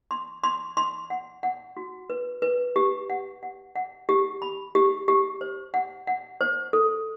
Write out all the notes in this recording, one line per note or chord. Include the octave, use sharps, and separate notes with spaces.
C6
C6
C6
F#5
F#5
F#4
B4
B4
G4
F#5
F#5
F#5
G4
B5
G4
G4
C5
F#5
F#5
C5
A4